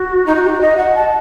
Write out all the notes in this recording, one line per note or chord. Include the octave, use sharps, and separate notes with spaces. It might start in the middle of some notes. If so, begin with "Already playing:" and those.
Already playing: F#4
D#4
F#4
G4
F#4
D#5
F#5
A5